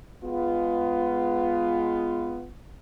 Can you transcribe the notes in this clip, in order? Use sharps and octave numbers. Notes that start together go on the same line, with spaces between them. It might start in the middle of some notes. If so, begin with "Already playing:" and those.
G#3 B3 F4